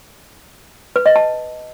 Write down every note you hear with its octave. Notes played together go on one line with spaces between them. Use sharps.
B4
D#5
A5